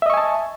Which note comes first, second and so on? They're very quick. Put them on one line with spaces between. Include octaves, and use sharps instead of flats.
E5 D#5 C#6 G#5 A5